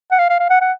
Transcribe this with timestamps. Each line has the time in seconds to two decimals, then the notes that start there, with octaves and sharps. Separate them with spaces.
0.12 F#5
0.19 F5
0.29 F5
0.40 F5
0.50 F#5
0.61 F#5